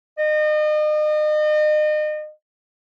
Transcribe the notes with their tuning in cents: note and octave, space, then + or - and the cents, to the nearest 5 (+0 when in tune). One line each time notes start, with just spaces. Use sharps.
D#5 -35